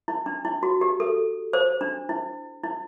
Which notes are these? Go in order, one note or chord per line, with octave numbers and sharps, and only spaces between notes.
E4
D4
E4
F#4
G4
A4
C5
D4
E4
E4